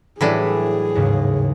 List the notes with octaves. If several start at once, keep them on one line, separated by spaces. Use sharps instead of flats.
A2 E3 F#3 G3 D4 E4 G#4
D#2 G#2 C#3